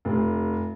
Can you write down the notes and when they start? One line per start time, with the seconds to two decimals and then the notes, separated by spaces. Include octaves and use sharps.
0.05 F1